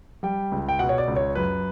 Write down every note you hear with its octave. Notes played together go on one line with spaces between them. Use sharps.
G3 G5
C#2
G5
B2 F#5
C#5
D5
C#2
C#5
F#2 B4